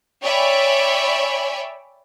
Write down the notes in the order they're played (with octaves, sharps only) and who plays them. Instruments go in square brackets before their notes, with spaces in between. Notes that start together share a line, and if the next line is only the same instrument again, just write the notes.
[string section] C#5 D5 E5 G5 G#5 B5